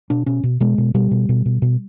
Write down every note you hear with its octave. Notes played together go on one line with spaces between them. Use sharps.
B2 D4
B2 C#4
B2
B2 G#3
B2
B2 G3
B2
B2
B2
B2